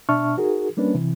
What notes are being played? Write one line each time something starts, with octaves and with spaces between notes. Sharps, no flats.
B2 D4 E5 A5 C#6 F6
D#4 F#4 G#4 A#4
G3 A#3 C#4 D4 B4
C3 E3